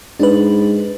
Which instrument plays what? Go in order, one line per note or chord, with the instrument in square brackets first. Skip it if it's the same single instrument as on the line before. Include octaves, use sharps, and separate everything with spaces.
[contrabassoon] G#2 [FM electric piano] D4 B4